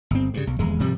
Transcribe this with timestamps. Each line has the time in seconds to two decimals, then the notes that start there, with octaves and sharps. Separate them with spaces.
0.11 G1 C4
0.34 G2 C#3
0.47 B1
0.59 D#1 E2 G#3
0.79 G#1 C3 F3 G3